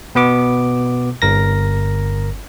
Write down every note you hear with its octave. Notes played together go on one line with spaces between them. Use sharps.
B2 B3 D6
G1 A#4 A#6